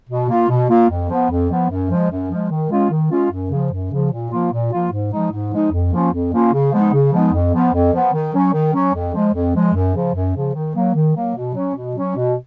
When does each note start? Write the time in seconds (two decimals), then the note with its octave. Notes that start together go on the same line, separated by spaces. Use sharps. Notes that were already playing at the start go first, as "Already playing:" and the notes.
0.10 B2
0.30 A#3 F4
0.49 B2
0.70 A#3 F4
0.89 F2
1.10 F3 B3
1.30 F2
1.50 F3 B3
1.69 F#2
1.91 F3 G#3
2.11 F#2
2.31 F3 G#3
2.50 D#3
2.70 G#3 C#4 F4
2.91 D#3
3.11 G#3 C#4 F4
3.31 F#2
3.50 C#3 F3
3.72 F#2
3.91 C#3 F3
4.12 A#2
4.31 F3 A#3 F4
4.52 A#2
4.72 F3 A#3 F4
4.92 G#2
5.12 F3 G#3 D#4
5.31 G#2
5.52 F3 G#3 D#4
5.72 F2
5.92 F3 A#3 C#4 F4
6.12 F2
6.32 F3 A#3 C#4 F4
6.53 C#3
6.72 F3 G#3 B3 D#4
6.93 C#3
7.12 F3 G#3 B3 D#4
7.33 F2
7.54 F3 B3
7.73 F2
7.94 F3 B3
8.13 D#3
8.33 F#3 C#4
8.53 D#3
8.74 F#3 C#4
8.94 F2
9.14 F3 G#3
9.34 F2
9.55 F3 G#3
9.74 F#2
9.95 C#3 F3
10.14 F#2
10.35 C#3 F3
10.55 D#3
10.76 F#3 A#3
10.95 D#3
11.15 F#3 A#3
11.36 B2
11.55 F#3 C#4
11.75 B2
11.96 F#3 C#4
12.16 B2